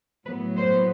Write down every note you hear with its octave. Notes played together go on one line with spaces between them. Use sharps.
A2 F#3 B3 B4
C5